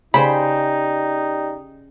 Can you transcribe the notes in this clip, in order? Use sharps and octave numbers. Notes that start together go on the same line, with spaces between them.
C#3 D#4 G4 C5 D5 G5 B5